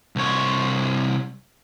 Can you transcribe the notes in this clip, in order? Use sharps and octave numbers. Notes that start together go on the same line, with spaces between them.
C2 C#5